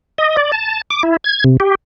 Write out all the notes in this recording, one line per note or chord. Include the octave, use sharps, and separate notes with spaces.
D#5
D5
A5
D6
E4
G#6
C3
G4